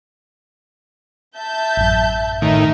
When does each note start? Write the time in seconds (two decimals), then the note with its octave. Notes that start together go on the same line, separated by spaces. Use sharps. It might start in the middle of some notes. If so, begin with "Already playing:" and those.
1.36 E5 A5 G6
1.77 A1 F#2
2.42 A2 D#3 D#4 A#4 E5